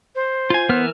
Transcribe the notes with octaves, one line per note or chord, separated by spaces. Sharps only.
C5
F4 G#5
E3 B3 A#4 F6